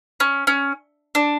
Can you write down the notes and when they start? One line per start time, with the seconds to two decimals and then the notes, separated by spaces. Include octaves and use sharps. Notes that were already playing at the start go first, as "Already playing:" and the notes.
0.20 C#4
0.47 C#4
1.15 D4